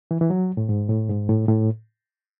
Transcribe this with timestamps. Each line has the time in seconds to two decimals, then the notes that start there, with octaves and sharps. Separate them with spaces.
0.11 E3
0.21 E3
0.30 F#3
0.57 A2
0.69 G#2
0.89 A2
1.09 G#2
1.29 A2
1.48 A2